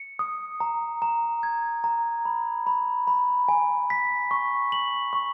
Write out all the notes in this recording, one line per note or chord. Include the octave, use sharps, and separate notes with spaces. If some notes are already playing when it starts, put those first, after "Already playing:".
Already playing: C#7
D#6
A#5
A#5
G#6
A#5
B5
B5
B5
G#5
B6
C#6
F#7
C#6